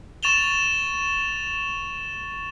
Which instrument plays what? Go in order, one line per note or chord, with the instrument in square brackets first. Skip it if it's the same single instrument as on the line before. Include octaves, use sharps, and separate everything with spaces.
[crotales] C#6 A6 E7 F7 G7